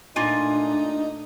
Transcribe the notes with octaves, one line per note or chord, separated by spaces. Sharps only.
A#2 A3 A#3 D4 D#4 F4 G#5